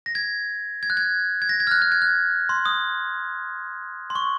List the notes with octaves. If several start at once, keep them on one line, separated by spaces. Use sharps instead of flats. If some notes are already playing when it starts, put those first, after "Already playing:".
A#6
G#6
G#6
F#6
G#6
G#6
A#6
G#6
F6
F#6
F#6
G#6
F#6
C6
D#6
C6
C#6